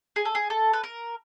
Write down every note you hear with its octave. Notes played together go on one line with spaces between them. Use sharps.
G#4
A4
G#4
A4
B4
A#4